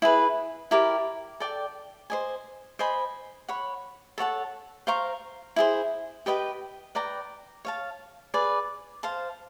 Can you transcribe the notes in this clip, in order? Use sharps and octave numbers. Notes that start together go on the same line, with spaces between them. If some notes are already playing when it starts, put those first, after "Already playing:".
E4 G#4 B4
E4 G4 A#4 D5
A4 D5 G5
C5 D#5 G#5
C5 D#5 G#5 B5
C#5 F#5 B5
A4 C#5 F#5 A5
C5 F5 A#5 C#6
E4 G#4 C5
G4 B4 D#5 G5
B4 D5 G5 A#5
C#5 F5 A5
G#4 B4 D5
C5 F5 A5